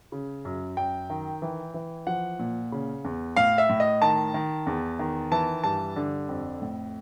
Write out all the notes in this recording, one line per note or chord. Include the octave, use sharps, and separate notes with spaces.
C#3
F#2
F#2 G5
D#3
E3
E3
F3 F#5
A#2
C#3
E2
A2 F5
E5
A2
D#5
D#3 A5
D#3
E2
D#3
E3 A5
G2 A5
D3
F2
A2